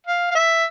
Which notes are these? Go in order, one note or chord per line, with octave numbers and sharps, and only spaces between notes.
F5
F5
E5